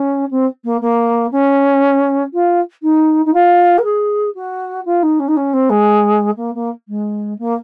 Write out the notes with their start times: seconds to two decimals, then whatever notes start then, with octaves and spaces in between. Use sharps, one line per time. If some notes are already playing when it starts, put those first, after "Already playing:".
Already playing: C#4
0.31 C4
0.64 A#3
0.81 A#3
1.32 C#4
2.33 F4
2.83 D#4
3.26 D#4
3.34 F4
3.78 A#4
3.84 G#4
4.35 F#4
4.85 F4
5.03 D#4
5.20 C#4
5.28 D#4
5.37 C#4
5.53 C4
5.70 G#3
6.37 A#3
6.55 A#3
6.88 G#3
7.39 A#3